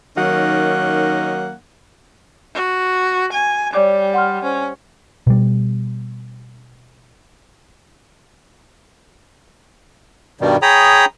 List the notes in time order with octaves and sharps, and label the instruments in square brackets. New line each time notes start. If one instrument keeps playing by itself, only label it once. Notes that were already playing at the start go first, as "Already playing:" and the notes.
[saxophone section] D#3 F#3 A#3 C#4 D#4 F#5
[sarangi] F#4
G#5
[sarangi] G3 [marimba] C#5 D5 D6
[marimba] F#5 C6 F6
[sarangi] C#4 [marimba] C5
[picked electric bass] B2 G3
[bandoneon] G2 B2 D#3 G3
G#4 C#5 G5 A#5 B5 D#6